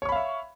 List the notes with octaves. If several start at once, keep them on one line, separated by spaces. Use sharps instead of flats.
C#5 E5 F5 B5 C#6